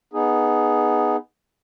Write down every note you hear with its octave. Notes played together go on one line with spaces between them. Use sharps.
B3 D#4 G#4